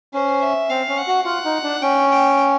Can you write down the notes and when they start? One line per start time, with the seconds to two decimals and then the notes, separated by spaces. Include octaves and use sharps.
0.14 C#4 C5
0.42 E5
0.70 C4 F5
0.88 C#4
0.98 F#5
1.07 F#4
1.25 F4 F#5
1.45 D#4
1.63 D4
1.82 C#4 G5
2.11 G5